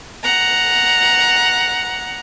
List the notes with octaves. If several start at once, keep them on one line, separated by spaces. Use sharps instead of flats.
F#5 A#5